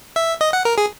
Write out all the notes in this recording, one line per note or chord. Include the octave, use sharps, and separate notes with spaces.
E5
D#5
F#5
A#4
G#4